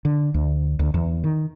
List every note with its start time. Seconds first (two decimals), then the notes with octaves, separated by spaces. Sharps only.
0.05 D3
0.34 D2
0.79 D2
0.94 E2
1.24 D#3